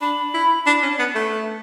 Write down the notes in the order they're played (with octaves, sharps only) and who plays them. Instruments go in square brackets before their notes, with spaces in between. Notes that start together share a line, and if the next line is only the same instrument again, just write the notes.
[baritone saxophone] D4 [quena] B5
[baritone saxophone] E4
D4
C#4
B3
A3